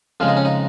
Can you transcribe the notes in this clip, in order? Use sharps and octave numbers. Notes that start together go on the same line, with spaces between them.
F2 C#3 G#3 F4
D#4
C#4
D#4